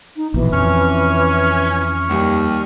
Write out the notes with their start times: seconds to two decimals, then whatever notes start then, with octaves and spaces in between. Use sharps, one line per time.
0.16 D#4
0.34 A#1 B2 E3
0.53 F2 C#4 C#6 F6
2.09 D#2 G3